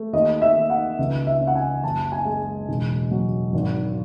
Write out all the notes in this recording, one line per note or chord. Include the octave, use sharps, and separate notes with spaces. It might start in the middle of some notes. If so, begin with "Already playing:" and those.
Already playing: A3
D#2 D#5
E5
D#2
F#5
C#2 E5
E5
C#4
F#5
G#5
F#1 A5
G#5
G#3
E1
F#3
G#1